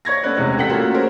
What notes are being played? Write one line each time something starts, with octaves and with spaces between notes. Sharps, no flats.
C#5 C#6 G#6 A#6
A3 B3 C#4 B4 D5
E2 C3 G#3 C#4
A1 G4 A4 F#5 G5 B6
A3 A#3 F4 F#4 A4
C#4 G#4 A#4 C5